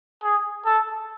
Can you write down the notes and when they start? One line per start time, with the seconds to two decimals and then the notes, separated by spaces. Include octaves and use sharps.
0.23 G#4
0.65 A4